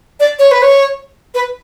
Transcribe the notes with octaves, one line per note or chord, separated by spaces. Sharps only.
D5
C#5
B4
C#5
B4